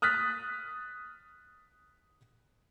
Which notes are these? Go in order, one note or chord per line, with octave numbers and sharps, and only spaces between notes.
D#6 F6 F#6 A6 B6